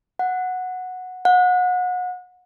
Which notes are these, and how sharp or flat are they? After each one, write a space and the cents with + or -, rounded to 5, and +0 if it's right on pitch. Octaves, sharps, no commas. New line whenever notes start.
F#5 -10
F#5 -30